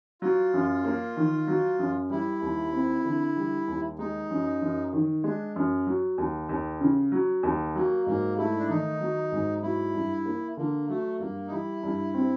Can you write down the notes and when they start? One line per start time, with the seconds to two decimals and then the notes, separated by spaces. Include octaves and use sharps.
0.22 F#3 F4
0.54 F#2
0.84 A#3
1.17 D#3
1.48 F#3
1.79 F#2
2.10 G3 E4
2.42 D#2
2.73 C4
3.05 D3
3.36 G3
3.68 D#2
3.99 G#3 D#4
4.31 F#2
4.62 F#2
4.93 D#3
5.24 G#3 D4
5.56 F#2
5.87 F#3
6.18 D#2
6.49 D#2
6.81 C#3
7.12 F#3
7.43 D#2
7.75 F#3 A#3
8.06 G#2 A#3
8.38 A3 E4
8.58 D4
8.69 D#3 D#4
9.01 F#3
9.32 G#2
9.63 F#3 E4
9.94 G2
10.26 A#3
10.57 D3 A#3
10.88 F#3 A3
11.19 G2 A#3
11.48 D#4
11.51 G3 E4
11.83 G2
12.14 C4